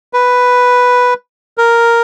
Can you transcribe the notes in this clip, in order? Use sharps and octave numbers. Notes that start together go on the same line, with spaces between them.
B4
A#4